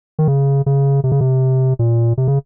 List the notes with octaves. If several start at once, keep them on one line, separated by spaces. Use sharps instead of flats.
D#3
C#3
C#3
C3
C#3
C3
A#2
C3
C#3